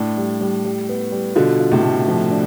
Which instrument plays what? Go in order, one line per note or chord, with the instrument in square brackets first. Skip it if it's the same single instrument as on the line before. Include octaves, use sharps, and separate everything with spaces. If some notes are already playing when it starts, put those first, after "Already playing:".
Already playing: [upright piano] A2 [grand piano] D4
[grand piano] G3
G3
G3
B3
G3
[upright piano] B2 D3 [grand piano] F4
[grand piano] F4
[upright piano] A2 C3
[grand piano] A3
F3
D4